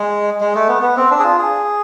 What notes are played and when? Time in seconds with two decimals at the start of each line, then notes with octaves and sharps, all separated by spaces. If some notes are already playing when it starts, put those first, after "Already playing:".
Already playing: G#3
0.41 G#3
0.55 A3
0.68 B3
0.82 B3
0.97 C4
1.11 D4
1.19 G#4
1.24 F4
1.38 G#4